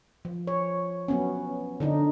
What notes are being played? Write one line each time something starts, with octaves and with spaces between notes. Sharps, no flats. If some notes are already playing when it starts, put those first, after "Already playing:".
F3
C#5
F#3 B3 C#4
D3 D4 D#4